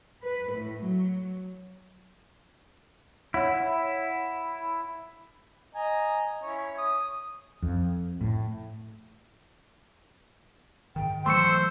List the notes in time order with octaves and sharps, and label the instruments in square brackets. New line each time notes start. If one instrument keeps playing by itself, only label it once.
[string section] B4
A2
F#3
[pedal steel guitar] E4 [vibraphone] C#5 F#5
[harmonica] D#5 G#5 A#5
C#4 E4 C#5
D#6
[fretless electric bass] F2
A2
[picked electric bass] G#2 D#3 [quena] G5
[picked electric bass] E3 F#3 A3 [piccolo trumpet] C5 [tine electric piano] C6 C#6 C#7 [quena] E6